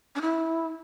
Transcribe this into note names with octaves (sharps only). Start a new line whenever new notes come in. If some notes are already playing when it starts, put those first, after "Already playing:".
D4
E4